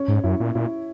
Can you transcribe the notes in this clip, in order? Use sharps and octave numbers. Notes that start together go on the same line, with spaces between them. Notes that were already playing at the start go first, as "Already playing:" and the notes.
Already playing: C#4
G#2
F#2 E4
A#2
A#2 E4